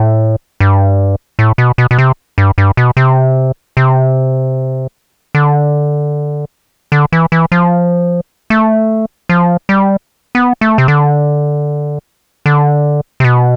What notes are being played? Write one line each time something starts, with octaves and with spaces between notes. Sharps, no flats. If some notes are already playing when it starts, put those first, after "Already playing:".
Already playing: A2
G2
A2
B2
B2
B2
C3
G2
G2
B2
C3
C3
D3
D3
E3
E3
F3
A3
F3
G3
B3
A3
C3
D3
D3
C3
B2